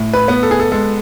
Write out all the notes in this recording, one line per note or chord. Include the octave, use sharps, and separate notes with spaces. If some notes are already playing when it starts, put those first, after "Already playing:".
Already playing: A2
B4
B3
A4
G#4
A4
G#3 A4